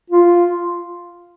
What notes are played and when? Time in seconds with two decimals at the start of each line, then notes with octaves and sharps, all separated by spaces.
0.10 F4